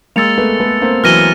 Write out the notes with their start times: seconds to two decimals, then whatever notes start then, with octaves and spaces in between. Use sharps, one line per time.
0.16 G#3 A#3 E6 A6 C#7 F7
0.38 A3 B3
0.60 A3 B3
0.82 A#3 C4
1.03 E3 F#3 F6 A#6 D#7 G7